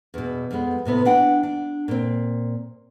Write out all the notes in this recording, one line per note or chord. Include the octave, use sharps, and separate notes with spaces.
E2 B2
F2 F3 G#3 B3
A2 C3 B3
E3 D4 F#5 G5
D4
A#2 C4